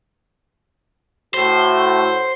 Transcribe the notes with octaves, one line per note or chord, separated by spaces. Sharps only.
A2 F#4 C5